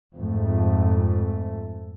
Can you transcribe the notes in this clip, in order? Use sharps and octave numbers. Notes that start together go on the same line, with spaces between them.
F2 G#2 A3